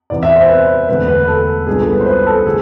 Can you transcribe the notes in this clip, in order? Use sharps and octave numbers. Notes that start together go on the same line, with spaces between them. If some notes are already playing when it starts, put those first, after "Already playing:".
E2 C3 E3 B3 D5
E5
C5
B4
E1 E2 D3 A3 B4
B4
A4
C2 B2 G#3 D4 F4 G#4
A4
B4
C5
B4
A4
D3 A3 E4 G#4